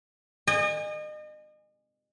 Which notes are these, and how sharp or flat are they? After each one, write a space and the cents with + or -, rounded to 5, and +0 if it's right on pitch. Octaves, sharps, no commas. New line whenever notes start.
D#5 -35 G#5 -25